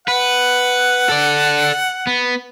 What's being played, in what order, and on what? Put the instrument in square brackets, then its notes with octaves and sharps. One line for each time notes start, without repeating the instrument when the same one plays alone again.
[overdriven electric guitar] B4 [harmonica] F#5
[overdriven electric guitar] A4 D5
B3